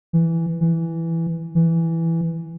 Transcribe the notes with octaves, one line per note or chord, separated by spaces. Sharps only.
E3
E3
E3